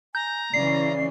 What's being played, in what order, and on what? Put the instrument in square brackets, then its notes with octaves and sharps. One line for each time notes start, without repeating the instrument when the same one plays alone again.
[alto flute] G#5 [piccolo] A#5 [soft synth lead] G6
[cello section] C#3 E3 C#4 [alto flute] D5 [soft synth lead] C7